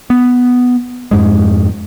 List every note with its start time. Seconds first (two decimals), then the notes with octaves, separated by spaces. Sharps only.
0.10 B3
1.11 F2 G#2 G#3